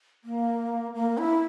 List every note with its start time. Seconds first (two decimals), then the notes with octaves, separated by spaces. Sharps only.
0.24 A#3
0.94 A#3
1.18 E4